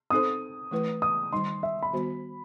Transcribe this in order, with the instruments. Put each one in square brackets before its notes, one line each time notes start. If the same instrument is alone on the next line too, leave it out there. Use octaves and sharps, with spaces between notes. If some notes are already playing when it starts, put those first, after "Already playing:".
[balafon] C4 D#4 A4 C5 [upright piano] D#6
[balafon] E3 A3 E4 B4
[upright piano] D#6
[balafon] D#3 G3 D#4 [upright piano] C6
[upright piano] E5
B5
[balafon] D#3 G3 B3 F#4 C5